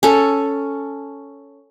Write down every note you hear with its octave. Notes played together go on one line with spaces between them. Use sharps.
C#4 A4